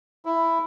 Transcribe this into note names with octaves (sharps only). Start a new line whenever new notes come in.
E4